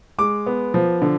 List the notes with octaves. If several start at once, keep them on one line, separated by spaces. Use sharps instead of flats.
G#3 D6
B3
F3
D3